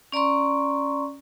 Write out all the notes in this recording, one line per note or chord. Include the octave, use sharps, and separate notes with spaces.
C#4 D5 A#5 C6 C#6